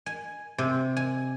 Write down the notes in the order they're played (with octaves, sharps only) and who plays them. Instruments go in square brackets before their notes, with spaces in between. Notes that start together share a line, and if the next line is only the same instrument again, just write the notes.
[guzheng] G#5
C3
G#5